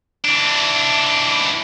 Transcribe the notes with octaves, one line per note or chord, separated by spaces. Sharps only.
E3 D4